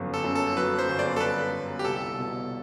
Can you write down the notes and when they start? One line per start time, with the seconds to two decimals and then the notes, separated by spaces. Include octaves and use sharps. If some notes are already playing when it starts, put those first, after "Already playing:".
Already playing: G1 F#2 F#3
0.14 A4
0.24 F#2
0.35 A4
0.57 F#3 B4
0.79 C5
0.89 G1
0.99 D5
1.16 A4
1.20 G1 B4
1.53 G1
1.79 G4
1.85 C2 A4
2.18 B2